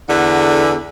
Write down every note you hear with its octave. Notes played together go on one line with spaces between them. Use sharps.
E2 D3